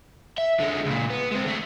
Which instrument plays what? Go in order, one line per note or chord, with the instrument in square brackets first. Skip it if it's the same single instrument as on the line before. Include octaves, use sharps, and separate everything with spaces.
[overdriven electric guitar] E5
D3 G#3
C#2 A#2
B3
G#3 C4
D3 A3